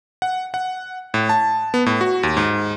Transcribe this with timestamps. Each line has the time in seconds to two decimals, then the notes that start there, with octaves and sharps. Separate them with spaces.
0.22 F#5
0.54 F#5
1.14 A2
1.29 A5
1.74 B3
1.86 A2
2.01 F#4
2.23 D#2
2.37 G#2